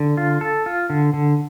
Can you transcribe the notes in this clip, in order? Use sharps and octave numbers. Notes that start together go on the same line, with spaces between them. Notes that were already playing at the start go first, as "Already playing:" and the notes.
Already playing: D3
F4
A4
F4
D3
D3